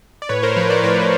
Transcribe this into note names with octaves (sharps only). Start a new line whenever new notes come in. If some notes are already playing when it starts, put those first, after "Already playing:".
D5
A2 B4 C#5
A#4 C5
F3 B4 C#5
C5 D5
A2 B4 C#5